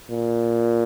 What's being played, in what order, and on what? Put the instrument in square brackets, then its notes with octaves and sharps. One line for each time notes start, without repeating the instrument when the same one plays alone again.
[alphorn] A#2